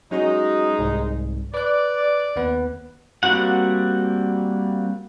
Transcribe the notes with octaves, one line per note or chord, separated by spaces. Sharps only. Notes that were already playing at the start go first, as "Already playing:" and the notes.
F#3 G#3 C#4 D#4 F#4
C2 G#2
B4 D5 F#6
D#2 B3 B4
G3 A#3 C4 F#4 F#5